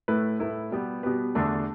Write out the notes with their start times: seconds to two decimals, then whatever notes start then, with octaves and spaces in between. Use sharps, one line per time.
0.08 A2 A3 E4 B4
0.40 A2 A3 E4 B4
0.71 B2 G3 B3 G4 B4
1.03 B2 G3 B3 G4 B4
1.35 E2 D3 A3 D4 A4